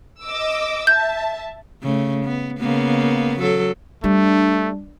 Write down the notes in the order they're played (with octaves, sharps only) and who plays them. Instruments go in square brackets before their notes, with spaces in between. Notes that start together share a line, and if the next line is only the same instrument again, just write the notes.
[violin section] D#5 D6 E6
[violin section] E5 A5 [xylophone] G6
[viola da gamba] C#3 A3
B3
C#3 A#3 B3
F#3 A4
[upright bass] G3 [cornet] A3 [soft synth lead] D4